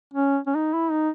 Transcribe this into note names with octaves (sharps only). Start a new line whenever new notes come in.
C#4
C#4
D#4
E4
D#4